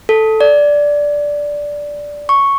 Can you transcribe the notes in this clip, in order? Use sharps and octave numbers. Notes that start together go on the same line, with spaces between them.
A4
D5
C#6